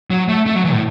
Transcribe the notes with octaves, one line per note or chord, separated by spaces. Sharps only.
F#3
A3
A3
F#3
E3
A2